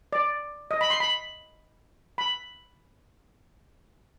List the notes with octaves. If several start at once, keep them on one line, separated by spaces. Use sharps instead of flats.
D5
D#5
B5
C6
B5
B5